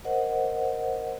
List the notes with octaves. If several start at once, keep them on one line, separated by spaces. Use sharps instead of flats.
A#4 C5 D#5 F#5